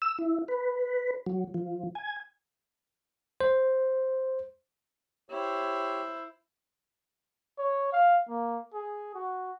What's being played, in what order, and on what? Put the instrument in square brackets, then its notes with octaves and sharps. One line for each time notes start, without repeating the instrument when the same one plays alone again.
[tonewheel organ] E6
E4
B4
F#3
F3
G#5
[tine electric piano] C5
[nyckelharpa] E4 C5 [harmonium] G4 C#5
[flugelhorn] C#5
F5
A#3
G#4
F#4